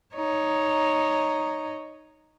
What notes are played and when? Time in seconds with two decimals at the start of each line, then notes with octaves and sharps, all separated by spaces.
0.15 D#4 C#5